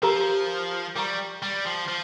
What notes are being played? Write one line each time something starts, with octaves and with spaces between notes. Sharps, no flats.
F3 G4 A#4 F5 A#5
G3 A#4 F5 A#5 C#6
G3
F3
F3